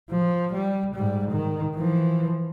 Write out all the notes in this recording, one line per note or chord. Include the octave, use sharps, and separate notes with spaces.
F3
G3
G#2 G3
D#3
E3 F3